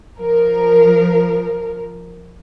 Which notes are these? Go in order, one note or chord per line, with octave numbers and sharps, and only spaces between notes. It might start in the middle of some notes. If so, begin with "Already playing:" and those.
F3 A#4